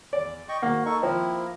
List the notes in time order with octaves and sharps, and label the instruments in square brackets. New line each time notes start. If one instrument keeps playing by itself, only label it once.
[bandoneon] E2 [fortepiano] D5
[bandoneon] D#5 G5 C#6
[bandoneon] G#2 D#3 [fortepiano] A#3 [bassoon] F#4
[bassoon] D#4 [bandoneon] A4 C#6
[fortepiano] F3 [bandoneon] A#3 E4 A#4 [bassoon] C4